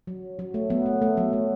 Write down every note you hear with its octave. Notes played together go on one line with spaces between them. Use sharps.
F#3
F#3
A3
F#3 B3
A3
A3
F#3 B3
A3